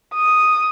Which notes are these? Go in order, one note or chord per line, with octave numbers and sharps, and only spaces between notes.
D#6